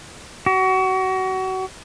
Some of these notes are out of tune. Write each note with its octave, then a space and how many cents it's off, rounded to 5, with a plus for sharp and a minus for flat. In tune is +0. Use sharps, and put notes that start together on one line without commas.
F#4 +30